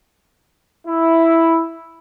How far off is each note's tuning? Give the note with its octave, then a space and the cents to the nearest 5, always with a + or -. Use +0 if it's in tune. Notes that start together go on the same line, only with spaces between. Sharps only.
E4 +0